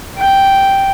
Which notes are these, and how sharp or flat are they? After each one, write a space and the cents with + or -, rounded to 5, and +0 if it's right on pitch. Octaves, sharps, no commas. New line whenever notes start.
G5 -5